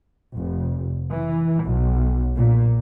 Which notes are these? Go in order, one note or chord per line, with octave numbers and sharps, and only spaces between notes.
F1
E3
B1
A#2